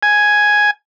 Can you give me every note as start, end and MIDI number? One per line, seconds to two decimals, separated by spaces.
0.03 0.71 80